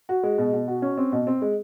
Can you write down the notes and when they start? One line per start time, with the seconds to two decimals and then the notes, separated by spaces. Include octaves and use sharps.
0.09 F#4
0.23 G#3
0.38 B2
0.53 B2
0.68 F#4
0.82 C#4
0.98 C4
1.12 B2
1.27 C4
1.42 G#3